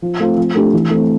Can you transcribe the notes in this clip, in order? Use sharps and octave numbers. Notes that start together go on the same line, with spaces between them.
F3
A3 C4 F4
F3
A3 D4 G4
E3
A3 C4